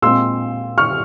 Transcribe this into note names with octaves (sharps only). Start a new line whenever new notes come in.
A#2 G#3 C4 C6 E6
C#6 F6